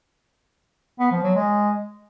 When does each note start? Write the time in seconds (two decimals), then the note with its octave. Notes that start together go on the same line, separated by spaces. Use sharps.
0.99 B3
1.11 F3
1.23 F#3
1.35 G#3